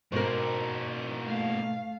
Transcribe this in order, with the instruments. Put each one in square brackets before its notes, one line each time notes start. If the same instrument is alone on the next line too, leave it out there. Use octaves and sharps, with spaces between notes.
[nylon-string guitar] G#2 B2 [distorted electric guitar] A#3 F#4 [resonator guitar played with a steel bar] A#4 C5
[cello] A3 F5